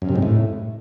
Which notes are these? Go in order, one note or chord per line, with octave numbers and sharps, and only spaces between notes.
F#2
C3
G#2
A2